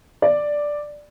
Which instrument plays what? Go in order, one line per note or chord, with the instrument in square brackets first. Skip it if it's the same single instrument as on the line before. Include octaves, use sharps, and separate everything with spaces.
[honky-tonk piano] D5